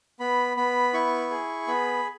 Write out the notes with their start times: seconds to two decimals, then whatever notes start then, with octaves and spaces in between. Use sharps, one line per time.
0.20 B3 B5
0.57 B3 B5
0.94 E4 C#6
1.31 G#4
1.67 B3 B5